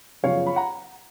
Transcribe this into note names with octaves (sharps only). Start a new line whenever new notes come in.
F#2 C#3 F3 B3 C#5 F5
B5
F#5 A#5